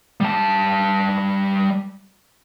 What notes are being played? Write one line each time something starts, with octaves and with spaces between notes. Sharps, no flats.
G3 A5